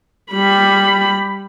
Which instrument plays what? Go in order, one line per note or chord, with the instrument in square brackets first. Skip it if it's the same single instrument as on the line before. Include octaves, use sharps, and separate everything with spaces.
[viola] G3 B5